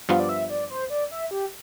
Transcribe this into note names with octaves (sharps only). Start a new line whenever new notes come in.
G2 F3 B3 F4 F5
D5
E5
D5
C5
D5
E5
G4